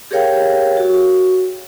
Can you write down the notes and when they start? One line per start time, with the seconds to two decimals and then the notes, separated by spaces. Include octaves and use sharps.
0.11 G4 G#4 A#4 C#5 F5 G5
0.77 F#4